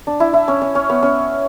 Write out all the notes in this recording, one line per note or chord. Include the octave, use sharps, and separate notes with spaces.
D4
E4
E4
C#4
C#4
C#4
B3
C#4